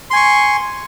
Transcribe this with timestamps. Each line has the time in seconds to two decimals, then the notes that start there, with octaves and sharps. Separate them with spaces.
0.10 C6
0.13 G#5
0.16 C#6